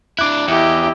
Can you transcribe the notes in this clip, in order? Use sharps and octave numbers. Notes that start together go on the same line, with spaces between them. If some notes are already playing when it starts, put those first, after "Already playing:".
D4 E4 D6 F#6
E2 E4 G4 D#5